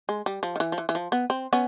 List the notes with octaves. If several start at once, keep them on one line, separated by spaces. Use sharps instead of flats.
G#3
G3
F3
D#3
E3
F3
E3
E3
F3
B3
C4
B3 C#4